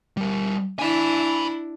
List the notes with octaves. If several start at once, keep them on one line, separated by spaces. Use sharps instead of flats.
G3 A#4
D4 E4 G#5 B5